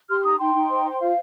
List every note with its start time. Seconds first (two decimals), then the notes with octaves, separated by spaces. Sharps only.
0.09 G4 C6 F6
0.20 C6
0.24 D#4 A#5 D#6
0.39 D#4 G5 C6
0.54 D#4
0.69 C5
0.85 C5 G5
1.00 F4 F5